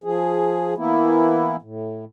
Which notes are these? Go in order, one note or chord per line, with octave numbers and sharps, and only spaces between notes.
F3 G#4
E3 A#3 B3 E4
A2